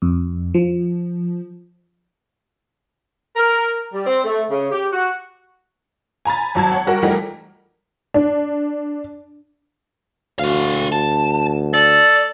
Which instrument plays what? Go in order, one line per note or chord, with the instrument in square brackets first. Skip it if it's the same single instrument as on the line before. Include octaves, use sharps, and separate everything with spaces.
[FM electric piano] F2
F3
[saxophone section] A#4
G3
C4
A3
C#3
G4
F#4
[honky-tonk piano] G#5 A#5 B5 A6
G#1 F#3 A5 G#6
C#5 F#5
G3 F#4 A#4 F#5
E3 F3 G3 A3 D#4 A#4
D4
[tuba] D2 [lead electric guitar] F#4 F5
[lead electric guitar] A5
[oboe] A4 [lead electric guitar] D5